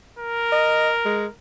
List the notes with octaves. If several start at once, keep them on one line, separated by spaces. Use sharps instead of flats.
A#4
D#5
G#3